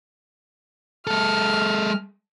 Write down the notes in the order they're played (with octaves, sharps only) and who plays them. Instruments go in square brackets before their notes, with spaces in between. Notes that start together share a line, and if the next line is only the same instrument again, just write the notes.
[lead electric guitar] G#3 A4 [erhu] F6